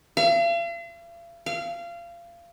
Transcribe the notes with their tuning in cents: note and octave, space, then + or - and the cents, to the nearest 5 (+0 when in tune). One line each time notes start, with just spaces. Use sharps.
F5 -45
F5 -25